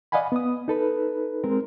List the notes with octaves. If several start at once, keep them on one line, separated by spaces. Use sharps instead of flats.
D5 D#5 F5 F#5 G#5 B5
B3 D#6
D#4 A4 B4
G#3 C4 A#4